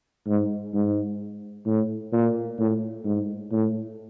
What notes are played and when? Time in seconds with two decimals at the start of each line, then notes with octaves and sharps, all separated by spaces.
0.28 G#2
0.74 G#2
1.66 A2
2.13 A#2
2.59 A2
3.05 G#2
3.52 A2